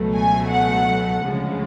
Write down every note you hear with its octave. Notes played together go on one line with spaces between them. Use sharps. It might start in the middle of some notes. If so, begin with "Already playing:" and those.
Already playing: C#2 B2 F#3 A3
G#5
F#5
D2 C#3 F3 G#3